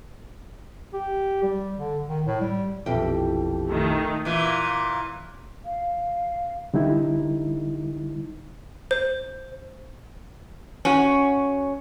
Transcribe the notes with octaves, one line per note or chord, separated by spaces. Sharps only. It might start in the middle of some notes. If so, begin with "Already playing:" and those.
G4
G3
D3
D#3
A2
G3
A#1 F2 B2 E3 G4
D#3 A3
A#2 E3
F5
D3 G3 D#4 E4
C5
C#4 F#4